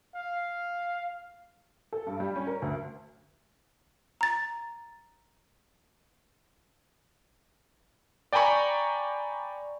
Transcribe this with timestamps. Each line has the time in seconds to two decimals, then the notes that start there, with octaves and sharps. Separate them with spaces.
0.15 F5
1.93 A4
2.07 G2
2.20 G3
2.36 C#4
2.47 A#4
2.62 D2
4.21 A#5 A6
8.33 D5 G5 G#5 A#5 B5 C#6